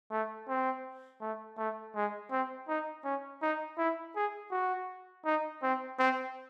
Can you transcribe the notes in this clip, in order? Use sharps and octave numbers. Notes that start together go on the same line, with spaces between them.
A3
C4
A3
A3
G#3
C4
D#4
C#4
D#4
E4
G#4
F#4
D#4
C4
C4